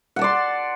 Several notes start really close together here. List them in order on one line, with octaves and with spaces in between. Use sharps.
F#5 A5 D5 C6